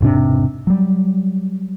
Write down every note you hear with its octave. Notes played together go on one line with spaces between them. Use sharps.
E1 G#2 C3 D4
F#3 G3